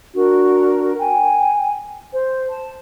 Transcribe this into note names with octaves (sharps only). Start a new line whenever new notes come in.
D4 F#4 A#4
G5 G#5
C5
A5